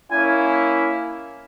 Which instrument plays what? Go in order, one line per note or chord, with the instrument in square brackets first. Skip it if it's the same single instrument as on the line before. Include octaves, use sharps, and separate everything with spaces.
[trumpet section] A#3 C#4 E4 G#5